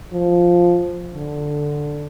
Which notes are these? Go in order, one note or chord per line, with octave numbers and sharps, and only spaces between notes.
F3
D3